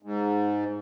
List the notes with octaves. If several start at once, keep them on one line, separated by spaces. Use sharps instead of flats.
G#2